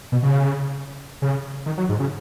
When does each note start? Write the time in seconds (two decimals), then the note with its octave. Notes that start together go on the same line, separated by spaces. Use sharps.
0.12 B2
0.23 C#3
1.22 C#3
1.66 D#3
1.78 F#3
1.89 G#2
1.99 C#3